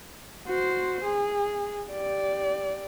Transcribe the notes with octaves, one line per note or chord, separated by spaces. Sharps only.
F#4 C5
G#4
G4 D5